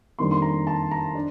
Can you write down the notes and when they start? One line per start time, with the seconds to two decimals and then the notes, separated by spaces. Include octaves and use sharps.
0.18 F2 D#3 G3 A#3 D4 C6
0.31 C6
0.42 A#5
0.67 A5
0.91 A#5
1.15 D4